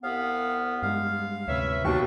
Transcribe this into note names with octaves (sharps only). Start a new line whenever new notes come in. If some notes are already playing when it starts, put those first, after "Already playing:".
C2 B3 F5
G2 G#3 F5
D2 C3 B4 C#5 E5
D#2 B2 C#4 D4 C#6